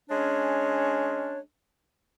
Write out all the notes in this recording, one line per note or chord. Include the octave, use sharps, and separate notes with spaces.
G#3 C#4 D4 C#5